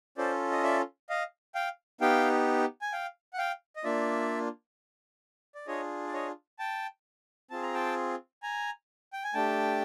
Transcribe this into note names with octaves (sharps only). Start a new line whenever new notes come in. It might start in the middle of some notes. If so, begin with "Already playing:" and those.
C#4 F4 A4 C5 D5
D#5
D5 E5
D#5 F5
F5 G5
B3 D#4 G4 F5 G5
G#5
F5 G5
F#5
F5 G5
D#5
A#3 D4 F4 D5 E5
D5
D4 F4 G#4 C#5 D#5
D5
C#5 D#5
G5 A5
C4 F4 G#4 A5
A#5
G5 A5
G#5 A#5
G5
G#5
A3 D4 G4 G5 A5